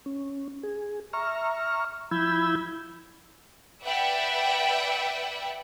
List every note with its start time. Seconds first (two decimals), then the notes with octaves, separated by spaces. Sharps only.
0.06 C#4
0.63 G#4
1.13 E5 A#5 C#6 F6
2.11 F3 E4 B5 E6 G6 G#6
3.83 B4 D5 E5 F#5 G5